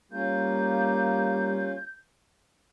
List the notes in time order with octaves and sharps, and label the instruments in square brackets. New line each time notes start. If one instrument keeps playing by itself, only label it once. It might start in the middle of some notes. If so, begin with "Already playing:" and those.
[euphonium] G3 [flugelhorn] A#3 [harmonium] C#4 F4 [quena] G6